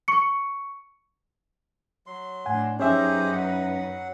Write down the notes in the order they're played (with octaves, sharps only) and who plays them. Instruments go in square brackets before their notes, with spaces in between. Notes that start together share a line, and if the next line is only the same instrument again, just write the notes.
[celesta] C#6 C#7
[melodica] F#3 C6
[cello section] A2 D4 [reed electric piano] F#5 G#5
[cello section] F#2 D#4 B4 [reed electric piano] C#4 E5 [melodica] G4 G#4 C5
[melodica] F#3 F#5